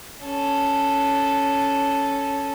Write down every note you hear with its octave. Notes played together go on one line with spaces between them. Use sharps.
C#4 A4